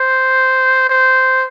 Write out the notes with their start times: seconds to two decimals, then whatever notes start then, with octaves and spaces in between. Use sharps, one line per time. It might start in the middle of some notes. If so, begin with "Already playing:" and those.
Already playing: C5
0.90 C5